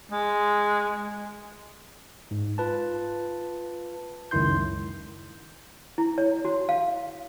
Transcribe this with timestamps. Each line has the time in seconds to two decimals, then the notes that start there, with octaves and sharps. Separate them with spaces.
0.11 G#3
2.31 G#2
2.58 F4 B4 A5
4.31 C#2 F#2 D#3 E4 C6 G6
5.98 E4
6.18 C#5
6.45 F#4
6.69 F5